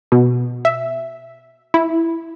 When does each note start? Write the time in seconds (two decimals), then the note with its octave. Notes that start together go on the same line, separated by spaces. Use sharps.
0.12 B2
0.65 E5
1.74 E4